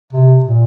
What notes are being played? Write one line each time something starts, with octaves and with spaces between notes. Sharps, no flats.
C3
A#2